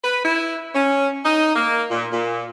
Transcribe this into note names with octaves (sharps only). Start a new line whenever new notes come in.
B4
E4
C#4
D#4
A#3
A#2
A#2